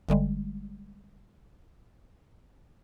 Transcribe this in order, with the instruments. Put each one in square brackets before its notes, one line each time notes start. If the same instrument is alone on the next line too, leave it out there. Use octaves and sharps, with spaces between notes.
[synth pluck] G1 D3 G3 G#3